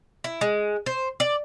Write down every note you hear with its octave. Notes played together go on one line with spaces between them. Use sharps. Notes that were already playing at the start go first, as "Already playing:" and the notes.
E4
G#3
C5
D5